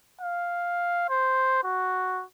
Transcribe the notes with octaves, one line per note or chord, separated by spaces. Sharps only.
F5
C5
F#4